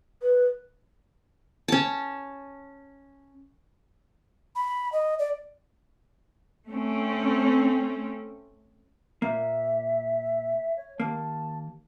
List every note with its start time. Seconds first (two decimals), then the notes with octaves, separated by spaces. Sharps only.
0.22 B4
1.68 C#4 A5
4.56 B5
4.92 D#5
5.19 D5
6.69 A3 C4 C#4
9.22 A#2 A#3 E5
10.77 C#5
11.00 D#2 A#3 A5